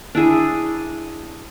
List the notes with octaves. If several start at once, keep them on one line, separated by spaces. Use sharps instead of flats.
D4 E4 G#4